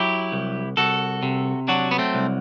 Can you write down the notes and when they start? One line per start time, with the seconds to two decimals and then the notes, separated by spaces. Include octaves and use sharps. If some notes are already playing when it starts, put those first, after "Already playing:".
Already playing: F#3 E4 G4
0.32 C2
0.77 C2 F#4 A4
1.23 C3
1.68 F#3 D4 F#4
1.91 B3
1.98 A3 C4
2.14 C2